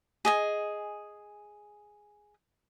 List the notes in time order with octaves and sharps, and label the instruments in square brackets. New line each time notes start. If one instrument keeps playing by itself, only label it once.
[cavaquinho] G#4 D#5 G#5